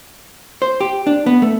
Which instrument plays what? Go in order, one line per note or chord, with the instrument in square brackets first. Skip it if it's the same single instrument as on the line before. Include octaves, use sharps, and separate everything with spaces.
[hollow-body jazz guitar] C5
G4
D4
B3
A3